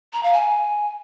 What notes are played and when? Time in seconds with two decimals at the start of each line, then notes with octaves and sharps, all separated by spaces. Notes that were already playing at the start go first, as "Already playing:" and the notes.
0.13 A#5
0.23 F5
0.33 G#5